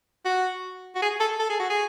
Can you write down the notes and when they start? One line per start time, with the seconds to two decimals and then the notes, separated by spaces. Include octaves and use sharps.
0.25 F#4
0.95 F#4
1.02 G#4
1.20 A4
1.39 A4
1.49 G#4
1.59 F#4
1.70 G#4